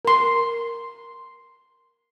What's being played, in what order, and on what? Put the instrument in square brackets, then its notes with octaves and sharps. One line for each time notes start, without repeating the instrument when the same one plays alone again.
[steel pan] A#4 C6